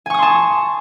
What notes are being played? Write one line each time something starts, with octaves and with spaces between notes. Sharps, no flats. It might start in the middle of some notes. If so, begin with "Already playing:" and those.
G#5 A5 C6 C#6 D#6